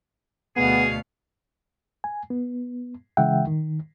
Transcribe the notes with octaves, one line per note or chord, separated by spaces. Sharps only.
D2 B2 B3 G#4 F5
G#5
B3
C#3 E3 G#3 E5 F#5 G5
D#3